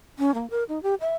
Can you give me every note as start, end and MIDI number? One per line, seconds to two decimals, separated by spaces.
0.19 0.34 61
0.34 0.49 58
0.50 0.64 70
0.69 0.81 63
0.83 0.95 67
1.01 1.16 76